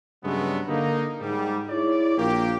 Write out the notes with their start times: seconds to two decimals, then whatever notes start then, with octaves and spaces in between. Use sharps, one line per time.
0.24 G2 C#3 F#3 G#3 A3 B3
0.68 D3 A#3 D#4
1.21 G#2 G3
1.69 E4 G#4 C#5 D5
2.18 A#1 A#3 G4